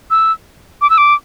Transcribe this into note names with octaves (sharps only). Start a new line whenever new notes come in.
E6
D6
E6
D6